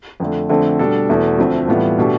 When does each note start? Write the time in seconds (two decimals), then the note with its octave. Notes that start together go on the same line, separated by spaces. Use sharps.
0.20 F2 D3 A3
0.49 F2 D3 A3 C4
0.79 B2 G3 D4 A4
1.09 E2 B2 A3 E4 A4
1.38 D2 D3 F3 A3 C4
1.68 A2 E3 G3 B3 F4
1.99 B2 A3 D4 G4